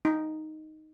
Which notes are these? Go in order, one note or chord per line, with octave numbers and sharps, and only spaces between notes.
D#4